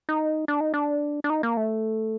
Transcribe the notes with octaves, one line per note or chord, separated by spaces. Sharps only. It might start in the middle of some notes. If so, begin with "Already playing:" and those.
D#4
D4
D#4
D4
D4
D#4
A#3
A3